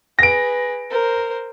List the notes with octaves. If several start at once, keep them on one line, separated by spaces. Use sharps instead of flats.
G#4 B4 A#6 D7
A#4 C5